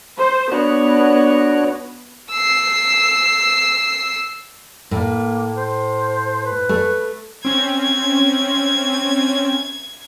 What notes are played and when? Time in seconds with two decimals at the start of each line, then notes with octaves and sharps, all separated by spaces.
0.18 C5
0.52 B3 D4 F#4 C#5
2.31 E6 C7
4.91 A2 A#3
5.56 C5
6.46 B4
6.69 A3
7.45 C4 C#4 G#6